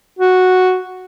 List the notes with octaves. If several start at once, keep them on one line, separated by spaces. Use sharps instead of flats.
F#4